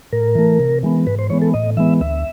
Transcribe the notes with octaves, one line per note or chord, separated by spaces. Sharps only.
A2 A#4
E3 A3
C3
E3 G#3 B3
G#2 B4
C5
E3 G#3 B3 C#5
A4
A2 D#5
E3 G#3 B3 E5
D2 E5